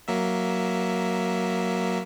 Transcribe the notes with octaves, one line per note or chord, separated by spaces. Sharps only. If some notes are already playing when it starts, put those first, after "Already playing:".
F#3 A#3 E5